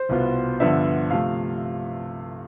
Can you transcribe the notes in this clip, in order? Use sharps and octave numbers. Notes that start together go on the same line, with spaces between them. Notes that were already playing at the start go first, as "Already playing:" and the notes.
Already playing: C5
C2 B2 B3 F4
G2 D3 F3 B3 D4 E5
C3 F3 A3 F5